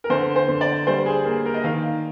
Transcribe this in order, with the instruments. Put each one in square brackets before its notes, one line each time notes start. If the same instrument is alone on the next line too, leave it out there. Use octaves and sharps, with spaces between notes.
[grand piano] A#4
D3 C5
C5
D3
D5
G3 C5
G#4
A#3 G#4
A#4
D#5
D#3 F5